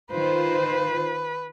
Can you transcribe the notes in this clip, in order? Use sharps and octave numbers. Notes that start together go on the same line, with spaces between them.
D#3 F4 B4 C5